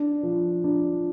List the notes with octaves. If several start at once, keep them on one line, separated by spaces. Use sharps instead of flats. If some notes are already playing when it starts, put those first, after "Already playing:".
Already playing: D4
F3
D4